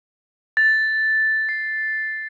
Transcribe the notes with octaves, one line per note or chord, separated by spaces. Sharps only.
A6
C7